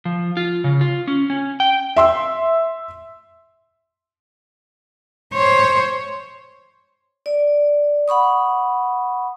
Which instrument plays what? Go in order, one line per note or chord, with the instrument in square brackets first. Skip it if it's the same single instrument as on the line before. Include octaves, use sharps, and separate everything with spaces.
[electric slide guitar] F3
F4
C#3
F4
C#4
C#4
G5
[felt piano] E5 C6 E6
[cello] C5 C#5
[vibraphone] D5
F#5 B5 C#6 D#6